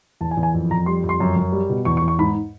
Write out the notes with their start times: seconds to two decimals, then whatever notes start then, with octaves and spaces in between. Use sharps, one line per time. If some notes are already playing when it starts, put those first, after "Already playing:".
0.21 E2 A5
0.31 G#5
0.37 E2
0.43 G#5
0.54 F2
0.71 F2 A#5
0.86 G3 C6
1.03 F2
1.09 C6
1.20 F#2
1.36 F#2
1.52 G3
1.70 B2
1.85 E2 C#6
1.97 C#6
2.02 E2
2.08 C#6
2.19 G#2 B5